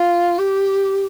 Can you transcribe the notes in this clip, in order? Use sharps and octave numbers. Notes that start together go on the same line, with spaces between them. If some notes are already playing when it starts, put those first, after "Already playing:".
Already playing: F4
G4